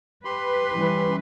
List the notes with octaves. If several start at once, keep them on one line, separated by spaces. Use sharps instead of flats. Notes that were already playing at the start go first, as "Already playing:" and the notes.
G4 B4 B5 C6
E3 G3 C#4